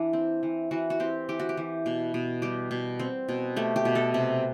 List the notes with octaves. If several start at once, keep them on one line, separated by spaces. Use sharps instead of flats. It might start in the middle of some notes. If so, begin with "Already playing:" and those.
Already playing: E3 D4 E4
C4
E3
E3 F#4
F#4
C4 G4
E3 G4
F#4
G4
E3
B2
B2
G3 G4
B2
C4
B2
A3 G4
G4
B2
A4
C3